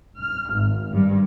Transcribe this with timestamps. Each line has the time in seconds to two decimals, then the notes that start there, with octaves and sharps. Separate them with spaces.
0.18 F6
0.54 G#1
0.93 G2